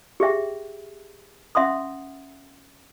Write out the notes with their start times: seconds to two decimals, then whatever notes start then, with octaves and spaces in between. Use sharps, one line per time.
0.20 G4 G#4 E5 G5
1.55 C#4 E5 F#5 C6 D#6